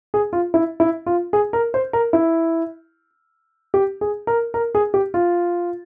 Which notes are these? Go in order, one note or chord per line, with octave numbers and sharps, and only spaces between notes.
G#4
F4
E4
E4
F4
G#4
A#4
C5
A#4
E4
G4
G#4
A#4
A#4
G#4
G4
F4